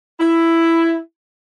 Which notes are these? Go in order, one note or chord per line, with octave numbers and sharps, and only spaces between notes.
E4